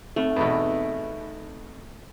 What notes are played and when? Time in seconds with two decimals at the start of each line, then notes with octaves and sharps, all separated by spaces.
0.16 A3 C4 D#4
0.36 E2 B2